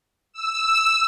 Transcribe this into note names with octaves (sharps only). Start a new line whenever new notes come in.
E6